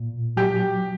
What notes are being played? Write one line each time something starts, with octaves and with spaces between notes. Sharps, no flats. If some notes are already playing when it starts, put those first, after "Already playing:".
Already playing: A#2
F#3 G4